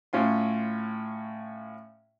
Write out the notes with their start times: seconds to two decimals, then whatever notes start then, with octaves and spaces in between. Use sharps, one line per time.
0.13 A2 C#4 F4 C6